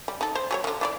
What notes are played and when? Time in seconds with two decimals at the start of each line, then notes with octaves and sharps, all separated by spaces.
0.08 G3
0.21 D#4 A4
0.35 C5
0.51 F#3 G#4 C#5
0.64 D3 D#3
0.81 E3 E4 D5